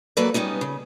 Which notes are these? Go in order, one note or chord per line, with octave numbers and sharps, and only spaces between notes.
G2 F#3 A#3 A4 B4 D5
G3 B3 C#4 D#4
C#3